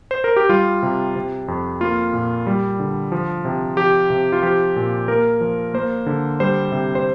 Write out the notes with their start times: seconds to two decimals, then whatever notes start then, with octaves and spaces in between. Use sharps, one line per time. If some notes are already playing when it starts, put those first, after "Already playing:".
0.11 C5
0.24 A#4
0.36 G4
0.49 G3 F4
0.83 C3
1.16 C3
1.48 F2
1.81 A#3 F4
2.14 A#2
2.47 G3
2.79 D3
3.12 F3
3.45 C3
3.77 F3 G4
4.10 C3
4.32 F4
4.43 F3 G4
4.76 A#2
5.08 A#3 A#4
5.41 F3
5.74 A#3 C5
6.06 D3
6.40 G3 C5
6.72 C3
6.95 C5